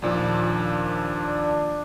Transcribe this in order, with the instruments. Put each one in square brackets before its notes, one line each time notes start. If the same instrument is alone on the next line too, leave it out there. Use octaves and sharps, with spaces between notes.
[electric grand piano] D#2 A#2 F3 [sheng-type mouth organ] D4